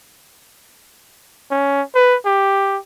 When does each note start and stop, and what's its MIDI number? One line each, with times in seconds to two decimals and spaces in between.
1.51 1.82 61
1.95 2.16 71
2.25 2.78 67